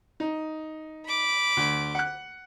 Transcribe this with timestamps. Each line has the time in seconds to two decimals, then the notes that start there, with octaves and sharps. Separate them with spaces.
0.20 D#4
1.07 B5 D6
1.57 D2
1.95 F#5 F#6